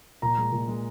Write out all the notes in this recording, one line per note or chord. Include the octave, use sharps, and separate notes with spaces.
A#2 A#5
G#3
A#2
G#3